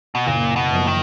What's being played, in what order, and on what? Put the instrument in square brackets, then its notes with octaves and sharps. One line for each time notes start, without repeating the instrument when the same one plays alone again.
[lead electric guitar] B2
[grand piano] F#1 [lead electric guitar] A#2
[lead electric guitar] B2
[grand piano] F#2 F3 A#3
[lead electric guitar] D#3